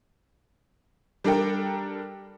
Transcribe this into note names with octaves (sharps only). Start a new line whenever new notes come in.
G3 D4 A4 A#4 G5